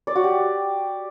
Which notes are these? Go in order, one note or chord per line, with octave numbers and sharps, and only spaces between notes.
D5
F#4
G4